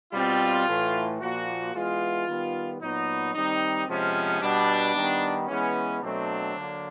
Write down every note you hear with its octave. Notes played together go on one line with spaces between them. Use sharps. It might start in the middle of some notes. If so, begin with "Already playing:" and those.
B2 G3 C4 F4
A2 E3 A3
A#2 F3 A#3 F#4
E3 G#3 B3 F4
D#3 G3 B3
A#2 F#3 B3 D#4
D#3 G3 C4 D#4
C3 F3 G#3 B3 C#4
B2 G3 B3 D4
D#3 G3 B3
E3 G#3 B3 C#4
B2 F#3 A3 C4 D4
D3 F#3 A#3